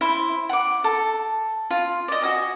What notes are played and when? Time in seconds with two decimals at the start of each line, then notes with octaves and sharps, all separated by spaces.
0.01 E4 C5
0.49 F#5 D6
0.84 A4
1.71 F4
2.08 D5 D#5
2.22 F#4 D#5 G#5